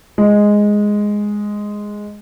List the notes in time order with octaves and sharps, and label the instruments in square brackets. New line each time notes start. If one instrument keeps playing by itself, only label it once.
[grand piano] G#3